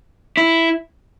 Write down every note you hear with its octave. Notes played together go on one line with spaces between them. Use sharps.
E4